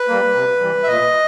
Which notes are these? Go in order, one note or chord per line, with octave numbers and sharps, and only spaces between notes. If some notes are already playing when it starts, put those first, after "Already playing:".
Already playing: B4
G3 A#3
C3
E3 G3
E5
A#2 D#5